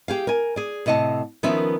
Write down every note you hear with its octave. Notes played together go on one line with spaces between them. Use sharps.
G4 G#4 F5
A#4 G#5
G#4 D5
A2 C3 D#5 F#5 A5
D#3 F3 B3 C#4 A#4 E5